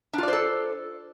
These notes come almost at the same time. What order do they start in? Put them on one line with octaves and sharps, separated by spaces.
D4 F4 D5 C5 A4